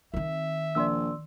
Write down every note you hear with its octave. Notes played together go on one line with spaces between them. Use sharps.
D#3 C4 E5
A#1 D5 C6 E6